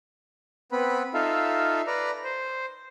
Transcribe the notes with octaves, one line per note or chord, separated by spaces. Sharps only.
B3 C4 B4 B5
D#4 F4 A4 E5 F5
B4 D5 A#5
C5